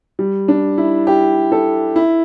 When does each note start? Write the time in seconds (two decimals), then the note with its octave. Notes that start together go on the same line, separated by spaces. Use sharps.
0.19 G3
0.48 D4
0.78 E4
1.07 G4
1.52 A4
1.96 E4